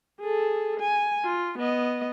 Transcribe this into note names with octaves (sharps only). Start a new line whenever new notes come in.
G#4 A4
G#5
F4
B3 D#5